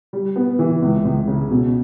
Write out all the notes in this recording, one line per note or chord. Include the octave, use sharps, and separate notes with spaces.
G3
B3
E3
C#2
C#2
C#3
B2